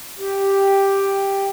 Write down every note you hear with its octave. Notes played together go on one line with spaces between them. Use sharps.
G4